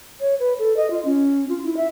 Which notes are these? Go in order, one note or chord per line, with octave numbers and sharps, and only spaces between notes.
C#5
B4
A4
D#5
F4
C#4
F4
E4
E5